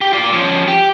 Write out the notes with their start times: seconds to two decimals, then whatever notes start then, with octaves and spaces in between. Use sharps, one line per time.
0.01 G4
0.13 F4 D5
0.33 F3 C#4
0.68 G4